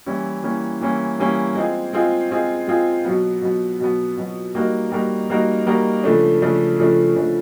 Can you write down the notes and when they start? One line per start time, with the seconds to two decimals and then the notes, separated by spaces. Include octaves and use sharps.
0.06 E3 G3 A#3 C#4 E4
0.43 E3 G3 A#3 C#4 E4
0.81 E3 G3 A#3 C#4 E4
1.19 E3 G3 A#3 C#4 E4
1.55 G#3 C4 F4 G#4
1.93 G#3 C4 F4 G#4
2.31 G#3 C4 F4 G#4
2.68 G#3 C4 F4 G#4
3.05 B2 F#3 B3
3.42 B2 F#3 B3
3.80 B2 F#3 B3
4.17 B2 F#3 B3
4.55 G3 A#3 D#4 F#4 A#4
4.92 G3 A#3 D#4 F#4 A#4
5.30 G3 A#3 D#4 F#4 A#4
5.67 G3 A#3 D#4 F#4 A#4
6.04 C#3 F3 A3 D4
6.42 C#3 F3 A3 D4
6.79 C#3 F3 A3 D4
7.16 C#3 F3 A3 D4